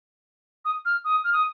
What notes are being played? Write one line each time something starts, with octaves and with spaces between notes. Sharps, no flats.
D#6
F6
D#6
F6
D#6